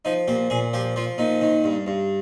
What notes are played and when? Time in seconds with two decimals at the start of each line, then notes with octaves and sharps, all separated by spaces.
0.05 F3 D#4
0.28 A#2 G4
0.50 A#2 G#4
0.73 F3 G4
0.96 F3 F4
1.18 A#2 D#4
1.41 D#3
1.64 G2
1.87 G2